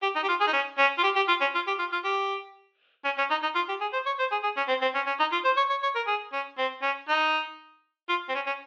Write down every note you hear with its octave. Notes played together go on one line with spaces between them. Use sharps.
G4
D#4
G4
F4
G#4
D#4
C#4
C#4
F4
G4
G4
F4
C#4
F4
G4
F4
F4
G4
C#4
C#4
D#4
D#4
F4
G4
G#4
C5
C#5
C5
G#4
G#4
C#4
C4
C4
C#4
C#4
D#4
F4
C5
C#5
C#5
C#5
A#4
G#4
C#4
C4
C#4
D#4
F4
C4
C#4
C#4